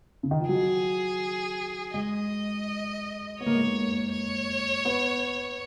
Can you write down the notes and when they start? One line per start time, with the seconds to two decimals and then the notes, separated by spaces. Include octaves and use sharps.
0.23 C#3
0.31 D#3
0.40 F3
0.48 F#3 G#4
1.94 G#3 D#5
3.40 B3 C#5
3.46 A#3
3.55 G#3
3.62 A#3
4.13 C#5
4.85 B3